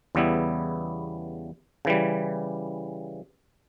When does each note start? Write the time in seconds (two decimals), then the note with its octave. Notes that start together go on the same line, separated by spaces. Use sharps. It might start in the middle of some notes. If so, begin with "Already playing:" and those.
0.15 E2 C#3 G3 B3 E4
1.85 C#3 E3 G3